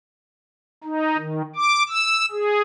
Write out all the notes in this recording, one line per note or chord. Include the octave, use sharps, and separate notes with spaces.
D#4
D#3
D6
E6
G#4